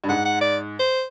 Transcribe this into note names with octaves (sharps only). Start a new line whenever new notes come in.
G2
G#2 F#5
F#5
D5
C5